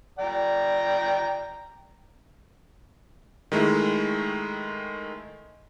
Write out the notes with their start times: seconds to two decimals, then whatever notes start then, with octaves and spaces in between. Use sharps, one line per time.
0.19 D5 G5 A#5
3.52 D#3 G#3 A3 E4